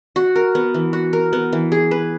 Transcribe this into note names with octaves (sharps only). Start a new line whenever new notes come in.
F#4
A#4
B3
E3
F#4
A#4
B3
E3
G#4
B4